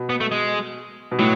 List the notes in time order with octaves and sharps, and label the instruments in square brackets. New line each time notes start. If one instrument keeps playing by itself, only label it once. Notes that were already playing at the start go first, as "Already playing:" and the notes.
Already playing: [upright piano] B2
[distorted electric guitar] B3
A3
G#3
[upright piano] B2
[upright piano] A2 [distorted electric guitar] F#3